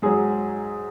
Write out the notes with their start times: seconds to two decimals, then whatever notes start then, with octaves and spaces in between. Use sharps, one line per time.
0.02 G#2 F#3 G#4